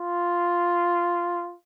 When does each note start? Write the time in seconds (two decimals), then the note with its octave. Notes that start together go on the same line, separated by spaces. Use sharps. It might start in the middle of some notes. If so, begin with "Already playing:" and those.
Already playing: F4